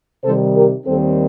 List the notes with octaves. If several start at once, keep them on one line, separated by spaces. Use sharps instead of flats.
C3 D#3 G3 A4 C5
G4 A#4
D#2 D#3 G3 C4 A4 C5